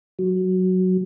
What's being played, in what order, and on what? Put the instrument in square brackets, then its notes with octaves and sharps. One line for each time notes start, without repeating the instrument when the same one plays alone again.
[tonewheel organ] F#3